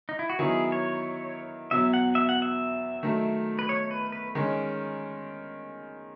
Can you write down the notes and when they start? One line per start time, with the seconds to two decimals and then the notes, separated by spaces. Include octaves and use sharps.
0.09 D#4
0.19 E4
0.30 F#4
0.39 D#3 F#3 B3 E4 G#4
0.72 C#5
1.71 E2 B2 F#3 E5
1.93 F#5
2.15 E5
2.29 F#5
2.42 E5
3.03 D#3 F#3 A3
3.59 B4
3.69 C#5
3.91 B4
4.12 B4
4.35 D#3 G#3 C#4